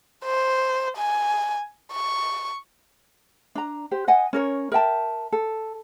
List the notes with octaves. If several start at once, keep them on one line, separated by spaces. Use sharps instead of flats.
C5
G#5
C#6
D4 A#5
G4 C5
D#5 F#5 G#5
C#4 A#4 C#5
A#4 E5 G5 A5
A4